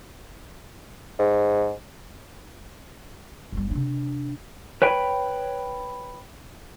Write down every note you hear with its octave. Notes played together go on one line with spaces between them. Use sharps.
G#2
G1 G3
C3 D4
B4 C#5 G5 B5